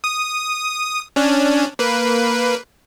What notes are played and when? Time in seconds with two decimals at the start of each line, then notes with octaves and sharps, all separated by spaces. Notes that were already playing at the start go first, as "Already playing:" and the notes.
0.04 D#6
1.16 C#4 D4
1.79 A#3 B4